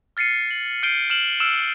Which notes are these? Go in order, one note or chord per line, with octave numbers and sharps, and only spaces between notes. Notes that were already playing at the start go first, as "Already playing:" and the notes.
F6 A6 C7 C#7 D#7
F#7
F6 G6 C7 D7 D#7 G7
F6 E7 F#7
E6 F6 D7 E7